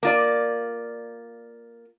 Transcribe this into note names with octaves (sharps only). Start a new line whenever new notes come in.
A#3 F4 D5